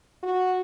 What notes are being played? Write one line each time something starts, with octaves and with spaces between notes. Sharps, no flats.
F#4